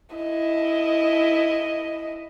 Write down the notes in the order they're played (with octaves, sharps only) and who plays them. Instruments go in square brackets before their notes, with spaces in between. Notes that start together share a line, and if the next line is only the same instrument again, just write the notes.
[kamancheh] E4 D#5